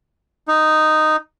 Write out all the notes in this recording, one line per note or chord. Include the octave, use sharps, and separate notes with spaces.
D#4